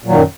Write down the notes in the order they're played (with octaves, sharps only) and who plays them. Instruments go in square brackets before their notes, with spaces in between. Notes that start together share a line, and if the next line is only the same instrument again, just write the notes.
[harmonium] A#2
F#3
D#3
F#2